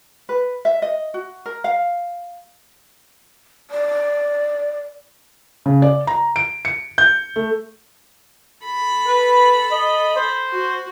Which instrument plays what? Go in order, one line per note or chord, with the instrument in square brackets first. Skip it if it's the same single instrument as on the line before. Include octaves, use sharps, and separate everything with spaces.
[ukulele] B4
E5
D#5
F#4
A#4
F5
[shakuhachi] D5
[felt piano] C#3
D5
A#5
D7
C#7
G6
A3
[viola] A4 B5
[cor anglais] B4
D#5
C5
[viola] F#4